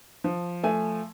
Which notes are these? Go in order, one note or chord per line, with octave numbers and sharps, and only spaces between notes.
F3
A3 G#5